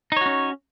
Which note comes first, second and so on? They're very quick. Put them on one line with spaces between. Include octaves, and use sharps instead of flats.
D#4 C#5 F#4 C#4